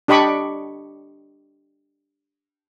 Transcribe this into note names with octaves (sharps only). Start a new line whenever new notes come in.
D4 G4 D#5 B5 C#6 D6